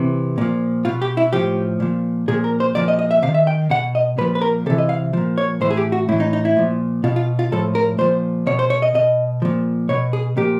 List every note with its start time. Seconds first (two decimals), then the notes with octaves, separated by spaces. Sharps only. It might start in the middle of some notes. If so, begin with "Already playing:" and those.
Already playing: C3 E3
0.38 A#2 F3
0.85 B2 F4
1.02 G4
1.17 E4
1.33 A2 F3 G4
1.80 A#2 F3
2.28 A#2 F3 G#4
2.44 A#4
2.60 C5
2.75 A#2 F3 D5
2.88 D#5
2.99 D#5
3.11 E5
3.22 C3 F5
3.27 D#3
3.34 E5
3.47 G5
3.70 B2 F#5
3.95 D#5
4.18 A#2 F3 B4
4.35 B4
4.41 A#4
4.66 C3 A4
4.70 E3
4.78 D#5
4.89 F5
5.13 A#2 F3
5.38 C#5
5.61 A2 E3 C5
5.70 G#4
5.77 G4
5.92 F#4
6.09 A2 E4
6.12 E3
6.20 D#4
6.33 D#4
6.45 E4
6.57 A#2 F3
7.04 B2 F4
7.16 F4
7.39 F4
7.52 A2 F3 A4
7.75 A#4
7.98 A#2 F3 C5
8.47 B2 C#5
8.59 C5
8.70 C#5
8.82 D#5
8.95 B2 D#5
9.42 A#2 F3
9.89 B2 C#5
10.13 G#4
10.37 A#2 F3 G4